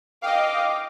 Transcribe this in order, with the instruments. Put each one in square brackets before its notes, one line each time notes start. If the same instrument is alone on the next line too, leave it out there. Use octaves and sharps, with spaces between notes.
[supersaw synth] D#5 F5 [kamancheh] G5 D6